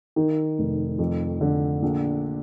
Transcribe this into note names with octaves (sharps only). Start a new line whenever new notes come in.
D#3
F1
F2
D3
A#1